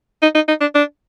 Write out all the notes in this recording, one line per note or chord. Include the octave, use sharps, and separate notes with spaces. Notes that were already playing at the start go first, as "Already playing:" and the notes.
D#4
D#4
D#4
D4
D4